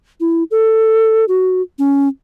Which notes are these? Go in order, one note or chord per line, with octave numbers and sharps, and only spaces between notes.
E4
A4
F#4
C#4